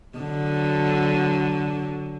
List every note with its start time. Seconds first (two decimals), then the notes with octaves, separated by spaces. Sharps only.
0.18 D3 F#3